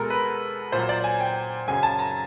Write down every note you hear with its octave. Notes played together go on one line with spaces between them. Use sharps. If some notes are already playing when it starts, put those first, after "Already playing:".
Already playing: B2 G#3 A4 A#4
B4
A#2 F#3 C5
D5
G#5
G5
F#2 C#3 F#3 G#5
A5
A#5